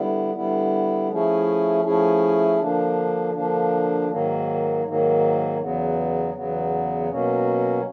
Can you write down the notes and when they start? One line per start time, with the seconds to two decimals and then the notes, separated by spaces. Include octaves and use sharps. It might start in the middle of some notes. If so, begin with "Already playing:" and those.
Already playing: D3 G3 B3 E4
0.34 D3 G3 B3 E4
1.09 F3 A3 C#4 E4 G#4
1.84 F3 A3 C#4 E4 G#4
2.59 D3 F3 A#3 D4
3.34 D3 F3 A#3 D4
4.09 G#2 D#3 F#3 A#3
4.84 G#2 D#3 F#3 A#3
5.58 E2 C#3 F#3 B3
6.34 E2 C#3 F#3 B3
7.09 B2 F#3 A#3 C#4